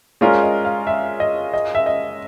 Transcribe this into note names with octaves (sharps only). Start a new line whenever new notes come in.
G#3 C#4 F4 A#4 D5
D#5
F5
E5
D#5
D#5
E5
D#5